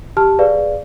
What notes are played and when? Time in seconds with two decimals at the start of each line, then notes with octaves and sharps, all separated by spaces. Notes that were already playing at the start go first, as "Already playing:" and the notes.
0.17 G4 A5 F6
0.39 G#4 B4 D5 F5